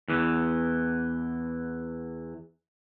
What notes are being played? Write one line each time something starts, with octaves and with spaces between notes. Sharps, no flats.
E2 E3